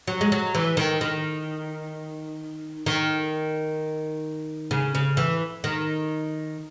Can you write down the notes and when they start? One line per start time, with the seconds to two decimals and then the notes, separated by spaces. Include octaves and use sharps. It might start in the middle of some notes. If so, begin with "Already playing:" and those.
0.08 F#3
0.21 G#3
0.32 F#3
0.55 E3
0.77 D#3
1.01 D#3
2.86 D#3
4.71 C#3
4.95 C#3
5.17 E3
5.64 D#3